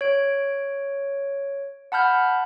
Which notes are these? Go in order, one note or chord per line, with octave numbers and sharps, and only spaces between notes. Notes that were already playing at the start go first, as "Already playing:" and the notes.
C#5 D7
F#5 A5 B5 F6 G6